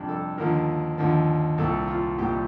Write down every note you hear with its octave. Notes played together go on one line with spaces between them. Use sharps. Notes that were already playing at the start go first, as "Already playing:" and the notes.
Already playing: F2 C3 G3 D4
A4
D#2 D3 F3 A#4
D#2 D3 F3
C2 A#2 G3 A4
F4
C2 A#2 G3 G4